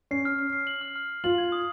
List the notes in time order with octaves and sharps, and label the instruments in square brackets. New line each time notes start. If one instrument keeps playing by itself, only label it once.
[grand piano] C#4 [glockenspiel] C7
[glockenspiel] F6
F6
C7
F#7
F6
F6
F6
[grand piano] F4 [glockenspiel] F#7
[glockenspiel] G#6
D#6